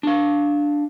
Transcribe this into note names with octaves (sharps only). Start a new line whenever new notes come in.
D4 F5